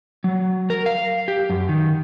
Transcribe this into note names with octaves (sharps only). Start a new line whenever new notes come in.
F#3
A#4
F5
G4
F#2
D#3